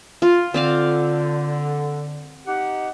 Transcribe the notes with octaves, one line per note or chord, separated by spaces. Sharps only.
F4
D3 C4 D5 F5
D#4 G4 F#5